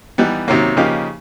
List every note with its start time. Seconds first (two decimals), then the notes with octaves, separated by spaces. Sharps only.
0.18 E3 G3 B3 D#4
0.48 C3 D#3 F#3 A#3 C#4
0.77 C#3 F3 A#3 D#4 G4